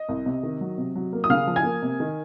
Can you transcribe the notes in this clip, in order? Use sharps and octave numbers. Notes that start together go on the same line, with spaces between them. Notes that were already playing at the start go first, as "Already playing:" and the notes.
Already playing: D#5
C2
C3
D#3
F#3
C3
F#3
A#3
D#6
C#3 F5 F6
F3
G#5 G#6
A#3
C3
D#3